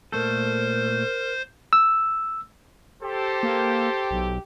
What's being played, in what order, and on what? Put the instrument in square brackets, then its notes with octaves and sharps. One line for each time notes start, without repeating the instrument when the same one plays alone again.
[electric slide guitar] A#2 A3 A4 [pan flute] A#4 [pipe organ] C5
[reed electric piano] E6
[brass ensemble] G4 [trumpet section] A4 C5
[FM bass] A#3
B1